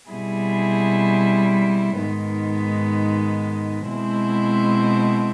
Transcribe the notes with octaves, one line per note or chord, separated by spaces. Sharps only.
B2 G3 C4 E4 G#4
G#2 D#3 G#3 B3
B2 G#3 C4 E4